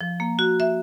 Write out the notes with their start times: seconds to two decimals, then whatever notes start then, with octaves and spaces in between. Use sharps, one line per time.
0.01 F3
0.20 A#3
0.39 F#4
0.60 E5